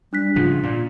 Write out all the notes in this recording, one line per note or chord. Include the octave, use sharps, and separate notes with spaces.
G3 D4 F#6 B6
G#2 C#3 F3 F4
A#2